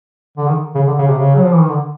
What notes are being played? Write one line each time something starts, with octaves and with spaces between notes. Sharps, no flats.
D3
D#3
C#3
D3
C#3
C3
C#3
F#3
F3
E3
D#3
D3